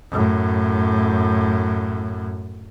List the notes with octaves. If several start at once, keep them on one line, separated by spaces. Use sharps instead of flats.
F#2 A2